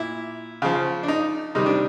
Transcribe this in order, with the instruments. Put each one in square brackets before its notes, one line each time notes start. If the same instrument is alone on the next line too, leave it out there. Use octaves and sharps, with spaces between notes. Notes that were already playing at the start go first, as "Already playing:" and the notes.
Already playing: [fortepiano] A#2 E4
C#3 F3
D4
D#4
C3 D#3 G3 D#4
D4